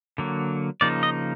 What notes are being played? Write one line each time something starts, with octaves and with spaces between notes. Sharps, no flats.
D3 F#3 A#3
C#3 F3 A#3 D#4 D5
D#5